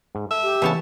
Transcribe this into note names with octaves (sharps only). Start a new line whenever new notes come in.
G#2
A4 E5
G4
C#3 E3 B3 D4 C#5 A5